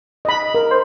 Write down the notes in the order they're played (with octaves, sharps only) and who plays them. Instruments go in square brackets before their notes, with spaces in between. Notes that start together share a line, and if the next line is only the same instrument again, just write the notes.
[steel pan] D#5 B5
A#4
[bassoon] C5